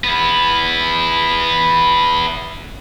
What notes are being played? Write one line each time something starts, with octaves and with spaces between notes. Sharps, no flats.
B3 E4